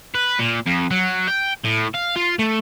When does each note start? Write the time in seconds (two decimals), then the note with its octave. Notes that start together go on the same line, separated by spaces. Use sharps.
0.15 B4
0.39 A#2
0.67 F2
0.91 F#3
1.27 G5
1.64 A2
1.94 F5
2.16 F4
2.39 A3